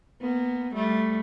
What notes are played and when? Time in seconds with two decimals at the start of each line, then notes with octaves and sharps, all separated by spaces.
0.21 A#3 B3
0.74 G3 A3